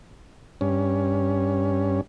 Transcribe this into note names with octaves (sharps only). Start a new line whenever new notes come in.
G2 C#4